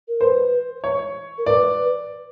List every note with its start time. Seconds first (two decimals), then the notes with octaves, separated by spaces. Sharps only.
0.08 A#4
0.21 B4 C5
0.84 C#5
1.38 A#4
1.46 B4 D5